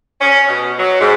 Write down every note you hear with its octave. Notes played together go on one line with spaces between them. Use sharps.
C#4
B2
F#3
G#2